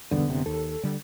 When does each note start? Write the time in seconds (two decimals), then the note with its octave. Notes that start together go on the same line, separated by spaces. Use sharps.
0.11 B1 E2 G2 D3 B3
0.27 F#1 C3
0.46 D#2 A4
0.83 D3 G3